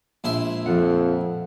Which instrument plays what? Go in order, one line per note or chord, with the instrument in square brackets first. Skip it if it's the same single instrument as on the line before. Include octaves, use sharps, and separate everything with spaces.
[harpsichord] A#1 E4 C6 [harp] G#3
[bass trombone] F2 [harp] F3 F#5